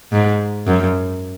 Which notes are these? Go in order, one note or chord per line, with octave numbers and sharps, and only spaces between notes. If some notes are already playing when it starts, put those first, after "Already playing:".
G#2
F#2